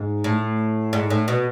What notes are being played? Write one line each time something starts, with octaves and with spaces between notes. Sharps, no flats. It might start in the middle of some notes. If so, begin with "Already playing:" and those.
Already playing: G#2
A2
G#2
A2
B2